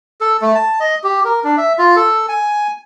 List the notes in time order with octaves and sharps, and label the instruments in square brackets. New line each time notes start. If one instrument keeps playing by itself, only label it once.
[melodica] A4
A3
A5
D#5
G4
A#4
D4
E5
F4
A4
G#5